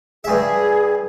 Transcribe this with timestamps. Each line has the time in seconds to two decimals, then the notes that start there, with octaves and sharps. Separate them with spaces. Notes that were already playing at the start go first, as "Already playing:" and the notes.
0.24 G2 G#4 E5